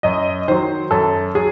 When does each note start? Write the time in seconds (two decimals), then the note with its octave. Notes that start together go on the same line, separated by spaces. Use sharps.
0.03 F#2 D#5
0.48 D#3 F#3 C5
0.91 F#2 A4
1.35 F#3 G#4